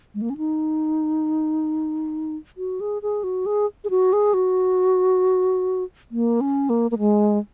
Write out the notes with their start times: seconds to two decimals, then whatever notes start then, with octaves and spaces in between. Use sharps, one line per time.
0.15 G#3
0.22 A#3
0.30 C#4
0.37 D#4
2.57 F#4
2.80 G#4
3.02 G#4
3.24 F#4
3.46 G#4
3.84 G#4
3.90 F#4
4.13 G#4
4.34 F#4
6.11 A#3
6.41 C#4
6.70 A#3
6.91 A#3
6.99 G#3